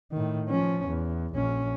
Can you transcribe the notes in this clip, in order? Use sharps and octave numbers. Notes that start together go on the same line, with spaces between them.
A2 D#3
F3 C#4
E2
A#1 C#4